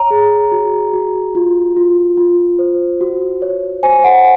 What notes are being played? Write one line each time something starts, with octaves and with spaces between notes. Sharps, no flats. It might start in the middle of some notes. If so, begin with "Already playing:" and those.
Already playing: C#5 A#5
G#4
F#4
F#4
F4
F4
F4
C5
F#4
C#5
C5 G#5
F#5